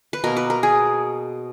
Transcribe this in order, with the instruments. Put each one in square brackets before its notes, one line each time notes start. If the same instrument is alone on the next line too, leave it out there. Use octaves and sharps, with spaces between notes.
[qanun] B4
B2 A#3 A#4
B4
A#4
G#4